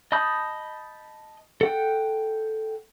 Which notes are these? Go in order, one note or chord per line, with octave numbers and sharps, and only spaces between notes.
D#5 A5 B5 D#6 G6
A4 F#5 G5